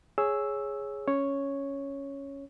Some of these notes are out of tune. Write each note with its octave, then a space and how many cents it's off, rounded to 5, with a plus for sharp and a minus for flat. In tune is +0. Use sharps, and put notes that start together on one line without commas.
G#4 +0 C#5 +0 E6 +0
C#4 +0 C#5 +0